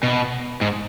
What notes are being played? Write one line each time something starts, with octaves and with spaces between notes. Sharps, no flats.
B2
G#2